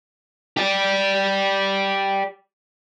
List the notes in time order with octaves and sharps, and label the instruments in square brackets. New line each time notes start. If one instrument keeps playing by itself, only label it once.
[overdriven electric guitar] G4 D5